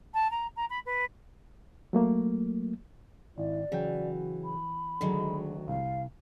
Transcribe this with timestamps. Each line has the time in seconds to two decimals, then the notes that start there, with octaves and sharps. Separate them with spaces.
0.14 A5
0.31 A#5
0.56 A#5
0.69 B5
0.85 B4
1.93 F#3 A3 A#3
3.38 G#1 E4 D5
3.72 C#3 E3 F#3 F#4 G5
4.44 B5
5.01 D2 D3 D#3 F#3 G#3
5.68 C2 F5